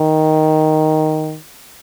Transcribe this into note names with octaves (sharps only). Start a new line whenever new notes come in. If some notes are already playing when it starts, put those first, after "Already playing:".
Already playing: D#3